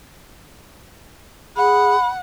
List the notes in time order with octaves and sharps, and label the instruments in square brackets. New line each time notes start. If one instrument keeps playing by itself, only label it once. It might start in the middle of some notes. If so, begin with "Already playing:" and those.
[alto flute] G#4 [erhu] F#5 [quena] B5